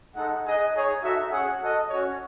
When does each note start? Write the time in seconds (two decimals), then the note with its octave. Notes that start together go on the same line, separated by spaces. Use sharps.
0.16 G#3 D#4 A4 D#5 F#5
0.45 D#4 G#4 D#5 F#5
0.74 D#4 G#4 C#5
1.03 D#4 F#4 A4 E5
1.31 C#4 G#4 C#5 F#5
1.60 F#4 A4 D#5
1.90 C#4 F#4 C#5